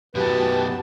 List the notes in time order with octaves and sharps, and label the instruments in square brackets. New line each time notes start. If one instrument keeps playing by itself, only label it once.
[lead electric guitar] F#2 B2 [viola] F#4 A5 [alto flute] G4 [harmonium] B4